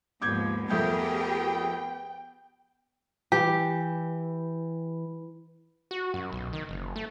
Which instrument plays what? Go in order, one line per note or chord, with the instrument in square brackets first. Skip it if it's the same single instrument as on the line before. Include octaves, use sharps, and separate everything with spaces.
[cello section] D#2 G#2 F3 [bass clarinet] B3 [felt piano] D6 G6 G#6
[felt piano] F2 A3 G6 [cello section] G4 G#4 A#4 [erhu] G5
[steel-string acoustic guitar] E3 [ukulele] G4
[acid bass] F#4
F#2
B1
D#3
F#1
A3